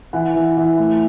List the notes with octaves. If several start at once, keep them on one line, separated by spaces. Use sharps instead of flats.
E3 F#5
E3
E3
A2